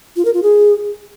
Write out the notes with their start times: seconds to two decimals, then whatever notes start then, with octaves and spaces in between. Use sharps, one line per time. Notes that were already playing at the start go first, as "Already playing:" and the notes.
0.16 F4
0.25 A#4
0.34 F4
0.43 G#4